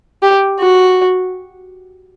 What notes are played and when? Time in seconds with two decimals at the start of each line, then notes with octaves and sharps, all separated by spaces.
0.22 G4
0.60 F#4